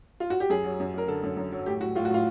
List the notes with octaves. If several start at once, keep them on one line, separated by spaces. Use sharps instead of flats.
F4
F#4
G4
F#2 G#4
F#3
F#2
F#2 A#4
D3 A4
F#2
F#2
F#3
A2 G4
A2 F#4
A2 F4
F#4
A2 F4